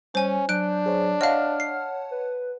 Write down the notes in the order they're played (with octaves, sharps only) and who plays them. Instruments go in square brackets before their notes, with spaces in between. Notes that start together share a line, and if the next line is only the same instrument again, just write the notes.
[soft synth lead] G3 [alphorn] C#4 [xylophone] C5 G#5
[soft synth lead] F#3 [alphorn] D4 [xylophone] F#6 D7 [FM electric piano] G6
[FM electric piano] G#4 C5 C#5
[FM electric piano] C#5 F#5 A5 [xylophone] D#5 F5 [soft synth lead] F6
[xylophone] C7
[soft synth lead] B4